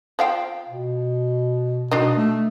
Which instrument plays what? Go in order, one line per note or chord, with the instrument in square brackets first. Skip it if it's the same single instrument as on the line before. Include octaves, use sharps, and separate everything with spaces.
[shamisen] F3 F5 G5
[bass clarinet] B2
[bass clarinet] B2 [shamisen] D4 D#4 D#5
[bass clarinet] A3